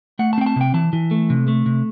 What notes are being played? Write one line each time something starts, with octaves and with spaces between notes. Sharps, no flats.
A3 F#5
A5
C4 G5
A5
C3 G5
E3 A5
E3
A3
C3
A3
C3